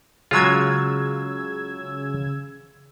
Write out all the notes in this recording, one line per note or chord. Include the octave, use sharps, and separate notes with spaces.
C#3 F#3 G#3 F4 E6 G#6